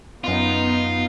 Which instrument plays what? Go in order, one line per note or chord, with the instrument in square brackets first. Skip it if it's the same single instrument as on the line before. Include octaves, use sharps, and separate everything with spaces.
[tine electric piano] F#2 F5 [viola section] B3 D#4 [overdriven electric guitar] F4